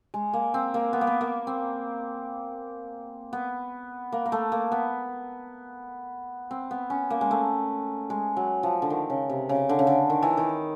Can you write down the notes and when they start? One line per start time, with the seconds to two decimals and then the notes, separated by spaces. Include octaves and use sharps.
0.14 G#3
0.33 A#3
0.54 C4
0.74 A#3
0.93 B3
1.01 A#3
1.07 B3
1.21 A#3
1.47 C4
3.33 B3
4.12 A#3
4.26 A#3
4.32 A3
4.52 A#3
4.72 B3
6.51 C4
6.71 B3
6.90 C#4
7.10 A#3
7.21 G#3
7.31 A3
8.10 G#3
8.37 F#3
8.63 F3
8.82 D3
8.90 D#3
9.10 C#3
9.30 C3
9.49 C#3
9.69 D3
9.79 C#3
9.87 D3
10.10 D#3
10.22 E3
10.37 D#3